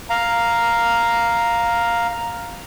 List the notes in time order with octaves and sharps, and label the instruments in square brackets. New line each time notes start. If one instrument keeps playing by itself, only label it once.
[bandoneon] F5 A#5